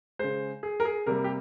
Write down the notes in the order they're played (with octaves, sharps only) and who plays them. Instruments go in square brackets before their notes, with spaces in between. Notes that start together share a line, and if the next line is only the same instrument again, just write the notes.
[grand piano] C#3 G#3 C5
G#4
A#4
G#4
C3 G3 A#3 A#4
G4